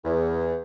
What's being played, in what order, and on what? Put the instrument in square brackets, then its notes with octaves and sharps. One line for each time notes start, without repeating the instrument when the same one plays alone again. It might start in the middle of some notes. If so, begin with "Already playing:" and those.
[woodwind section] E2